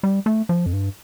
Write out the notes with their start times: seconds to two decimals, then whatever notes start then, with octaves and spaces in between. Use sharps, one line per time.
0.03 G3
0.26 A3
0.49 F3
0.66 F2
0.73 G2